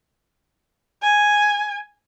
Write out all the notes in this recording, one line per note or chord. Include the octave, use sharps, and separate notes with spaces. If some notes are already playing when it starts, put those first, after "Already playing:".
G#5